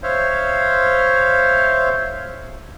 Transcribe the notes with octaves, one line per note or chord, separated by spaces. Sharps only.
C5 C#5 E5 F5